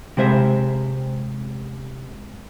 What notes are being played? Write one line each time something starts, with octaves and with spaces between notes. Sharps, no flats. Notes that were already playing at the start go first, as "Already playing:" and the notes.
C3 G#3 C5 E5